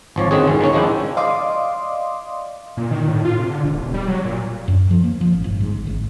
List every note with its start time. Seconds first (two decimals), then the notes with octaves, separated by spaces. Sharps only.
0.16 G#1 F3 C#5 D5
0.31 D3 D#3 C4 C#4 F#4 G#4
0.48 C#2 G#2 D#3
0.61 D#3 A#3 C#4 C#5
0.73 F3 G#3 D4 E4 G5
1.17 D5 D#5 F5 C6 D6 D#6
2.77 A#2
2.91 D#3
3.08 A2
3.25 F4
3.38 C3
3.50 D3
3.64 E1
3.82 E1
3.94 G3
4.07 F#3
4.25 A#2
4.68 F#2
4.91 F3
5.04 A#3
5.21 F3
5.33 A1
5.44 G1
5.60 G#2
5.73 G#1
5.87 G#1